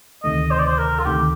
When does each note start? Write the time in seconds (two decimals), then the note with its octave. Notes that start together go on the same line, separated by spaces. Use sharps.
0.23 D2 C3 D#3 A3 D#5
0.51 C5
0.59 D5
0.66 C5
0.78 A#4
0.99 F4
1.05 D2 C3 D#3 A3 G4